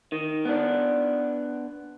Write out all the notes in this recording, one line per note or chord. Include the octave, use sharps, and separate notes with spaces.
D#3
B3 D4